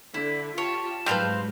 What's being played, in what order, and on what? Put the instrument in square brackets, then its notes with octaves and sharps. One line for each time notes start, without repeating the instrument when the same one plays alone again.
[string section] D3 [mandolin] E4 [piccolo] B6
[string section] F4 G4 [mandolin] C#5 [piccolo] A5
[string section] G#2 F#3 [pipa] G3 B4 [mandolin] C4 F5 G6